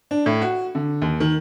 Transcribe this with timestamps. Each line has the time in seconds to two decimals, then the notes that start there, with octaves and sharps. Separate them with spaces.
0.11 D4
0.26 A2
0.42 F#4
0.75 D3
1.02 D#2
1.20 D#3